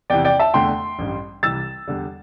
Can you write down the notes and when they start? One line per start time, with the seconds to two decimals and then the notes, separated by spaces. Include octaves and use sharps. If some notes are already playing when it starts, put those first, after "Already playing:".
0.10 E2 C3 E3 D5 G5
0.25 D5 G5
0.39 E5 A5
0.54 E2 D3 A3 G5 C6
0.99 A1 G2 G3
1.43 C2 C3 E3 G3 E6 A6
1.88 E2 D3 G3